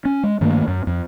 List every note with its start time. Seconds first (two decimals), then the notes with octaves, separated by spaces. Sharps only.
0.05 C#4
0.23 G#3
0.41 G2 D#3 A3 A#3
0.68 F#2
0.87 F2